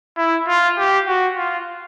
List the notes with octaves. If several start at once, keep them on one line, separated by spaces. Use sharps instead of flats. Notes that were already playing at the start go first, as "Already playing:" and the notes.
E4
F4
G4
F#4
F4